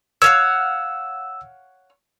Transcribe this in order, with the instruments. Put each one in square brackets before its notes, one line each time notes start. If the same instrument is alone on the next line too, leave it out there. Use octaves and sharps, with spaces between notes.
[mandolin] C#5 F5 F#5 [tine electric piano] E6